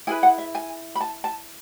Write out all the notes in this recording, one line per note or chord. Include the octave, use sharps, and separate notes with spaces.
E4 G#4 B4 G#5
F#5
E5
G#5
B5
A5
A5